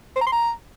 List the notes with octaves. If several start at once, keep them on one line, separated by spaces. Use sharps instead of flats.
C5
A#5
C6
A#5